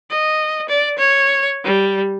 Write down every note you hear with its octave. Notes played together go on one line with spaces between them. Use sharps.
D#5
D5
C#5
G3